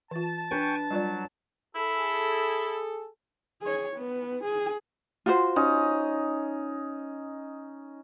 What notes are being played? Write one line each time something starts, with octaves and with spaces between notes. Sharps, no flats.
E3 F4 A5
D4 B4 G5 G#5 C#6
F#3 G3 F4 D5
E4 G#4 A4
G#4 C#5
B3
G#4
F4 F#4 C5
C#4 D#4